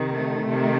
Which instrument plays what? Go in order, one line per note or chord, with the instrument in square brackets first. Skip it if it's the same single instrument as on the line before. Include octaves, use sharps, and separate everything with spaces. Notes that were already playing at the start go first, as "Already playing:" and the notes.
Already playing: [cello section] C3 D#3
A3
C3 D#3